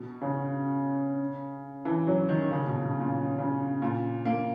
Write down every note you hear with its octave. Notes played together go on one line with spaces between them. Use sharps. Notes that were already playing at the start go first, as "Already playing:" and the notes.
Already playing: B2
C#3
E3
F#3
D#3
C#3
B2
B2
A#2
C#3
A#2
A#3